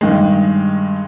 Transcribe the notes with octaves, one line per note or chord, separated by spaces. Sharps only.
G2 D#3 G#3